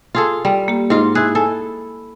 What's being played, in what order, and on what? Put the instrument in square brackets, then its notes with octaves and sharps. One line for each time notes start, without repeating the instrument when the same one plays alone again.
[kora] F4 G#4 A4
G3
[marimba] A#3 G4
[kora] G#2 F4
[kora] E4 G#4 [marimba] F#6
[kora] A4 [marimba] G#5